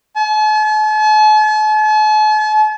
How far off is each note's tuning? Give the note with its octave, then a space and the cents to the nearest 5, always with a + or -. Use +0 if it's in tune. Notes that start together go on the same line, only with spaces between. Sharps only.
A5 -45